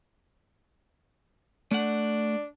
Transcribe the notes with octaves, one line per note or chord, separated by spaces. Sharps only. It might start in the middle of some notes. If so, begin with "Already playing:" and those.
A3 D4 F#5